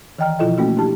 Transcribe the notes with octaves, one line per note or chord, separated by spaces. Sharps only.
D#3 E3 D#5 G5 A#5 F6
B2 F3 E4 F4 A4 D#5
A3 A#3 C#4 F#4
D4 E4 G4 A5